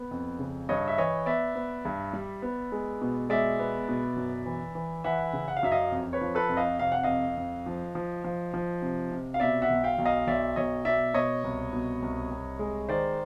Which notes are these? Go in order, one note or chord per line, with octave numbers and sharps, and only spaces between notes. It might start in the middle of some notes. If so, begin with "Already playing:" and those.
Already playing: B3
F2
C#3
G2 C#5 D#5
E5
E3 C#5 D#5
B3 D5 E5
B3
G2
G3
B3
G#3
B2
G#3 D5 E5
B3
B2
F#2
E3
E3
E3 E5 F#5
C#3
F#5
F5
F#2 E5
D#5 F5
F2
B4 C#5
F3
A4 B4
F2
D#5 F5
C3 F5
F#5
F2 D#5 F5
F2
F3
F3
F3
F3
C3
C3
F5
B2 D5 E5
E5 F#5
B1
F5 G5
B1
D#5 F5
B1 D5 E5
B1 C#5 D#5
B2 D5 E5
B2 C#5 D#5
C2
B2
C2
C2
G#3
D#3 C5 D5